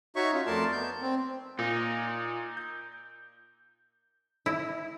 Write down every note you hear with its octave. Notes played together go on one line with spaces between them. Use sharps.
D#4 F#4 C#5 E5 C#6
C#4 F4
F2 A3 A#4 D5 A5 C6
B3 G6
C4
A#2 D#4
G6
E4